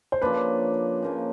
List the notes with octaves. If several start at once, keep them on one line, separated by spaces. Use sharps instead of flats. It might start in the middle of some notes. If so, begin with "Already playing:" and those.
C5
C#3 F3 A#3 D4 B4
C#3 F3 A#3 D#4